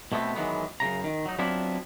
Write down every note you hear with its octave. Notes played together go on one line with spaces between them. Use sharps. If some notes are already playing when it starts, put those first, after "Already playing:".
B2 A3 B3 C4
D#3 E3 F#3 G#3 B3
F#2 A#2 C#3 A#5
D#3
F#3 D#4
F#3 B3 C4 D4 E4 F4